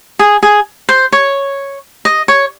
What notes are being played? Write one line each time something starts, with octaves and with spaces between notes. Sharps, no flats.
G#4
G#4
C5
C#5
D#5
C#5